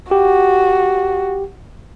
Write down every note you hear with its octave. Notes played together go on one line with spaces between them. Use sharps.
F#4 G4